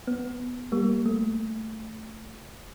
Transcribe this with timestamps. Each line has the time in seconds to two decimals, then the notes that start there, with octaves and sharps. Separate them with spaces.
0.08 B3
0.72 G3 A#3
1.06 A3